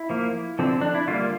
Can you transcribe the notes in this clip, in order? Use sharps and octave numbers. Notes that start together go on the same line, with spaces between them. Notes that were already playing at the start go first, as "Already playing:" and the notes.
Already playing: E4
F3 A#3
D3 F3 C4
D4
E4
D3 G3 A#3 F4